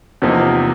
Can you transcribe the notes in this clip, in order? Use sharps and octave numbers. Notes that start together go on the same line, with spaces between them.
E2 C3 F3 A#3 D#4